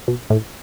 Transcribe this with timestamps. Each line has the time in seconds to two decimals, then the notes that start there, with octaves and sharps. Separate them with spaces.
0.08 B2
0.30 A2